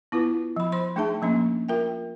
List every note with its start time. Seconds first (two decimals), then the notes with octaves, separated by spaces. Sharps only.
0.12 B3 E4 F4 B4
0.56 F3 B5
0.72 F3 C5 B5 C6
0.96 A3 D4 D#4 G#4 E5 A5
1.22 F3 A#3 C#4 D4
1.69 F4 A#4 E5 G5